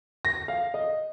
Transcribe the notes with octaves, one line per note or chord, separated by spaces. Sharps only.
A#6
F5
D#5